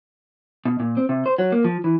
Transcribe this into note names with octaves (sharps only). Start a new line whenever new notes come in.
B2
A#2
C4
C3
C5
F#3
A#3
F3
E3